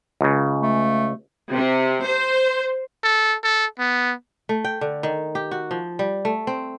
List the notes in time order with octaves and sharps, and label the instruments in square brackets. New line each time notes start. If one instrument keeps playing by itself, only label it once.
[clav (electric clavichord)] C#2 C#3
[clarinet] A3
[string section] C3
C5
[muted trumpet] A4
A4
B3
[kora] A3
G5
D3
D#3
G4
F#4
F3
G3
A3
C4